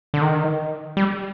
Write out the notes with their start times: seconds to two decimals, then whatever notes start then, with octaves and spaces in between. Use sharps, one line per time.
0.14 D3
0.22 D#3
0.97 G3